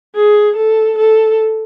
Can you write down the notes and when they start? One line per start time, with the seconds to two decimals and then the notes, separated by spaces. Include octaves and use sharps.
0.15 G#4
0.56 A4
0.98 A4